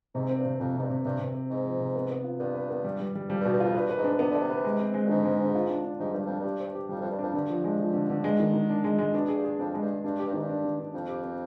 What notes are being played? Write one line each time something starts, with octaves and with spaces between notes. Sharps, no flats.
G#2 C3
C4
G2
C3
F2 C3
G#2 C3
G2
C3
G2 C3
C3
C4
G#2 C4
F3
C3
B3
B3
F4
G2 B3
B4
B3
G3
G3
G3
F2 G3
G2
B2
G2
F2 F4
G2 B4
B4
G#2
D4
C3 B3
D3 B3
C3
B4
G#3
C4
G#3
G2
G#2 D3
G#3
D3
F4
D4
D4
G#2 G3
G2 G3
F2 D4
G2 G4
C5
G4
F2 G3
F2
C5
G2
F2 D4
G2 D3
F3
G#3
F3
D3
D3
G#3
D#3
D#3
D4
G#3
G#3
B2 D4
G#4
G2
G#4
F2 D4
G#3
G2
G#3
G2 D4
G4
G2
G#2 D#3
G2
D4
D#3
D4
F2 C4
G4
C4